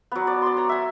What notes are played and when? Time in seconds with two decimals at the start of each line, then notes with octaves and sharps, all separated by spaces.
0.12 F#3 B3
0.27 D5
0.42 D5 C6
0.57 C#5 A#5
0.69 E5 G#5